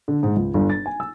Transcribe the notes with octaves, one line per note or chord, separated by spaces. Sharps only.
D3
G#2
C#2
G1
A6
G#5
E6